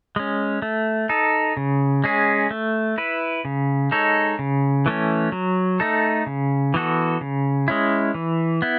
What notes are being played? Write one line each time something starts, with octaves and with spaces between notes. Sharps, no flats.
G#3 C#4
A3
D#4 A4
C#3
G#3 C#4 G#4
A3
E4 B4
C#3
G#3 D#4 A4 C#5
C#3
E3 A3 C#4
F#3
A3 D#4 A4
C#3
E3 B3 F#4 A4
C#3
G#3 C#4 E4
E3
B3 E4